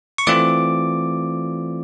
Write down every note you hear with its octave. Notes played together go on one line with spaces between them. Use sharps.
C#6
E3 A3 C4 F4 D5 D6